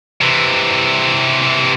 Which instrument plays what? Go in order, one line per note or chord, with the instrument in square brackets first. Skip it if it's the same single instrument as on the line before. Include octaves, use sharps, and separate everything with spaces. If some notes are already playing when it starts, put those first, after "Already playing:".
[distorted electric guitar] C3 E3